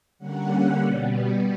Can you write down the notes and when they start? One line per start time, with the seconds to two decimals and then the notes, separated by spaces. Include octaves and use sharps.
0.19 D3 G3 A#3 C#4 F#5
0.82 B2 G3 B3